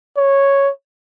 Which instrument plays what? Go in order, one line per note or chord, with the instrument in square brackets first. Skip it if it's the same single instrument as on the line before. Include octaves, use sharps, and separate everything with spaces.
[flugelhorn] C#5